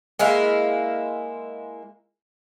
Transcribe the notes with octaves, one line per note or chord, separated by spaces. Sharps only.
G#3 A#3 E4 F5